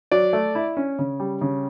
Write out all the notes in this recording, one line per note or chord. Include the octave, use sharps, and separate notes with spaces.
F#3 D5
A3
E4
C#4
C#3
G3
C#3